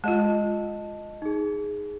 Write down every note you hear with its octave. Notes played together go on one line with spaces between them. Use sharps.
G#3 F4 D#5 A5
D#4 G#4